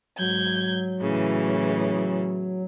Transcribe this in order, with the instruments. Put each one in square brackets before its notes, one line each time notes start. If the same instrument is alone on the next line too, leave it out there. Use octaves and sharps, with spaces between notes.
[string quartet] G#2 G6 G#6 [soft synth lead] F#3
[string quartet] A2 C#3 E3